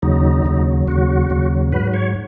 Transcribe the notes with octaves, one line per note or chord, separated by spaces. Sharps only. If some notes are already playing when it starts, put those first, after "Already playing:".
D#2 C#3 F#3 D#4
D#2 C#3 F#3
D#2 C#3 F#3 F#4
D#2 C#3 F#3
G#2 F#3 B4
C#5